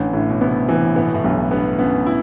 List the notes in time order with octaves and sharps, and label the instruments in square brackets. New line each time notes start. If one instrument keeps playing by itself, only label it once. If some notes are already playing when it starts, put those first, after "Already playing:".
Already playing: [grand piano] A1 [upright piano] D3
[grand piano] A2 [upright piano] D3
[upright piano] B2
[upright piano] C3 [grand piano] B3
[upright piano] C3 [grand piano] E3
[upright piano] A2 [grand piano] B3
[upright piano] B2
A2
[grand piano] B1 [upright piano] G2
[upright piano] G2 [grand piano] B3
[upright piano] F#2 [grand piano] B3
[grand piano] E4